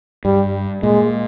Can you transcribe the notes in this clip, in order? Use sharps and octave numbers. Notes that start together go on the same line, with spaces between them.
G2 G3
A#2 G#3